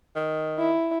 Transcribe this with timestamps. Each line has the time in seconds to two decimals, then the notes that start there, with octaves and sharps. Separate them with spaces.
0.16 D#3
0.58 E4